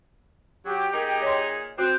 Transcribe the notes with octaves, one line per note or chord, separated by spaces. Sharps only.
F#3 G4
A#2 D#4 G#4 A#4
C#5 D#5 C6
C4 F#4 F#6 G6